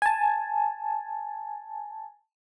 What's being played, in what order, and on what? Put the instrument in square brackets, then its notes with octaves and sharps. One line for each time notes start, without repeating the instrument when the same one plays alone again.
[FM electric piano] G#5 A5